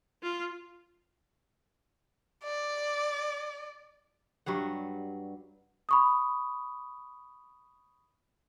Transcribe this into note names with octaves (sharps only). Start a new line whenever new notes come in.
F4
D5
G2 F#3 G3 F#5
B5 C#6 D#6